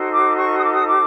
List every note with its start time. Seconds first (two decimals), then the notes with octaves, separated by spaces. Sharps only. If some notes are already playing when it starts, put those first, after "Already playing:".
Already playing: D#4 F#4 A4 C5
0.13 D6
0.36 C#6
0.58 D#6
0.65 D6
0.73 D#6
0.87 D6